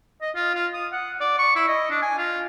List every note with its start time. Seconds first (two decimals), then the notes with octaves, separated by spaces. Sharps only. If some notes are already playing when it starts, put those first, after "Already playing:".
0.21 D#5
0.35 F4
0.54 F4
0.73 D#6
0.92 F#5
1.20 D5
1.38 C#6
1.55 E4
1.68 D#5
1.90 D4
2.02 G#5
2.18 F4